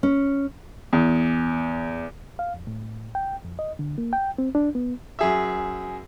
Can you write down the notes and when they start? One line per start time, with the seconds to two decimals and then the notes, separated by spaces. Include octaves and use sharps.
0.03 C#4
0.93 E2
2.39 F5
2.54 F2
2.67 A2
3.15 G5
3.45 F2
3.59 D#5
3.79 D3
3.98 A#3
4.13 G5
4.38 C4
4.55 D4
4.75 B3
5.19 F#2 G#4 E5